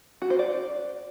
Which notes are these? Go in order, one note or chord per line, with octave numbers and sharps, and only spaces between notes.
F#4
C5
D5